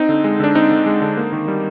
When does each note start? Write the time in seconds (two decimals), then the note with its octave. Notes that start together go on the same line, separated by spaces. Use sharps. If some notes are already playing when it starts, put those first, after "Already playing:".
Already playing: C4 D#4
0.09 D3
0.24 G#3
0.40 D3 D4
0.55 C4 D#4
0.71 D3
0.86 G#3
1.02 D3
1.17 A#3
1.32 D#3
1.48 G3